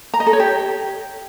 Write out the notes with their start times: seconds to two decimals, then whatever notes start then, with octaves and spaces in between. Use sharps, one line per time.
0.14 A#5
0.20 D#5
0.27 A4
0.33 C#5
0.40 G4